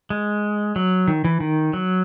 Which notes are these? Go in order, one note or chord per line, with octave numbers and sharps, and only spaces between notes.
G#3
F#3
D#3
E3
D#3
F#3